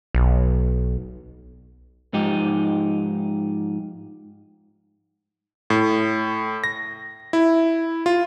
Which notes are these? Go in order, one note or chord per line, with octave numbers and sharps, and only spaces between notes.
B1
G#2 F3 D#4 G4
A2
A#6
E4
F4